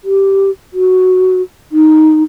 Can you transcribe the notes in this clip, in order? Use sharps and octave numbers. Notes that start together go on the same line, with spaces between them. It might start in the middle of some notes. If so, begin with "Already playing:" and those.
G4
F#4
D#4